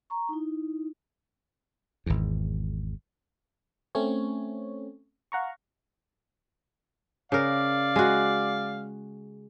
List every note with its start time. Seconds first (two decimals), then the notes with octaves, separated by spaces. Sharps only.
0.10 A#5 C#6
0.29 D#4 E4
2.06 G#1 E2
3.95 A3 C4 C#4 C#5
5.32 F5 F#5 A#5 C#6
7.32 C#3 A#4 D5 F5
7.96 G#3 F#4